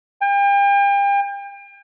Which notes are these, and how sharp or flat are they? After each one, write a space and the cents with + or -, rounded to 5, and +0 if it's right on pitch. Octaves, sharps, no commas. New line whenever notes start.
G5 +40